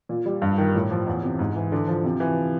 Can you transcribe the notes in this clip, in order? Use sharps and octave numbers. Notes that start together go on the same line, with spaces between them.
A#2
G3
G2
D#3
A2
F3
E2
C3
G#2
E3
D3
F3
C3
E3